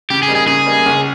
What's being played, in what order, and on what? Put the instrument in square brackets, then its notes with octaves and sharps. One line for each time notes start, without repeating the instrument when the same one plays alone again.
[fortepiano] C#3 [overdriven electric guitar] G4
[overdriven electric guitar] G#4
[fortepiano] G3 A#3 D#4
[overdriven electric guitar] G#4
[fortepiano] C#3 [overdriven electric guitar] G#4
[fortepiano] G3 A#3 D#4
C#2